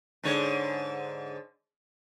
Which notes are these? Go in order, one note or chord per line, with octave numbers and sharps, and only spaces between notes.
G#2 D3 C#5